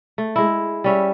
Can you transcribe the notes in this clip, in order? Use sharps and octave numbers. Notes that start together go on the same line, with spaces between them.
A3
G#3 E4
G3 C#4 E5